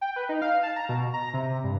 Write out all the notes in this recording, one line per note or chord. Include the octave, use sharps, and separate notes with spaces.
G5
B4
D#4
F5
A5
A#5
B2
A#5
C3
G2